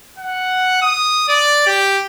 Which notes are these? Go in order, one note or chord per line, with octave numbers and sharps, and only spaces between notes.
F#5
D#6
D5
G4